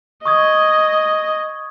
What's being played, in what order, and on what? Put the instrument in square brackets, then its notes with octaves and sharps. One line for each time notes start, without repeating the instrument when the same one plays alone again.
[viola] D#5 [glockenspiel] C#6 D#6 G#6